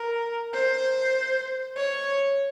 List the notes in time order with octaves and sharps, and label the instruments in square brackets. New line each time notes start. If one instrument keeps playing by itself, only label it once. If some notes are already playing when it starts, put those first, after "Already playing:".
Already playing: [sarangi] A#4
C5
C#5